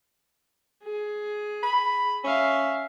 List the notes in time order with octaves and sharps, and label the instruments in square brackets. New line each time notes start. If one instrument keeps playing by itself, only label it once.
[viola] G#4
[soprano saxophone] B5
[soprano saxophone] C#4 [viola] E5 F5